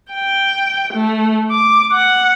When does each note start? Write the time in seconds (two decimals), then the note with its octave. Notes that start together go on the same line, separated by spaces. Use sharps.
0.12 G5
0.93 A3
1.51 D6
1.92 F#5